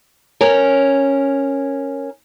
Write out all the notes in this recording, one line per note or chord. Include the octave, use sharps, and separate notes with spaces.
C#4 A#4